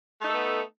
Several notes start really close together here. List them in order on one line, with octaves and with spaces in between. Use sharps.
A3 D#4 A4 B3